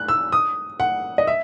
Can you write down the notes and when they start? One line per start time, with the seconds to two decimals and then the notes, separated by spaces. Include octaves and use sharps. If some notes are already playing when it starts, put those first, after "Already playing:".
Already playing: F#6
0.09 E6
0.32 D#6
0.80 F#5
1.18 D#5
1.27 E5